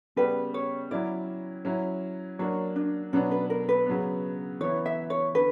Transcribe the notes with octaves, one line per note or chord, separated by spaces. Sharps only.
C#3 G3 B3 B4
C#5
F#3 C#4 E4 D5
F#3 C#4 E4
F#3 A#3 D4 C#5
D4
B2 F#3 B3 C#4 D4
B4
A#4
B4
C#3 F#3 B3
E3 B3 E4 C#5
E5
C#5
D3 B4